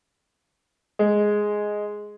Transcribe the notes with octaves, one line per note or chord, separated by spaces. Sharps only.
G#3